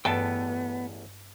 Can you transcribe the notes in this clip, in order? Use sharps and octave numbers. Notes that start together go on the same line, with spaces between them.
A1 E2 G2 B3 A4 G5 A5